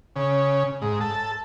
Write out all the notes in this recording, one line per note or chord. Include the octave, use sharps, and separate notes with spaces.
C#3
G#2
A4